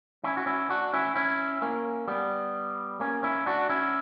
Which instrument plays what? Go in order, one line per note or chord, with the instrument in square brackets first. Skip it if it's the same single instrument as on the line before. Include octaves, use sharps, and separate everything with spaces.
[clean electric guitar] C#4 E4
F#4
C#4 E4
D4 F#4
C#4 E4
C#4 E4
A#3 C#4
G3 B3
A#3 C#4
C#4 E4
D4 F#4
C#4 E4